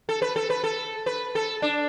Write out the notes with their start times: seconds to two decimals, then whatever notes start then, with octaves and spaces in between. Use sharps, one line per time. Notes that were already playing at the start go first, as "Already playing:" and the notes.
0.09 A4
0.22 B4
0.36 A4
0.50 B4
0.64 A4
1.06 B4
1.35 A4
1.62 D4